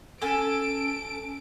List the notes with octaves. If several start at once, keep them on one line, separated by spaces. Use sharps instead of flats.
C#4 A4 G#5 D7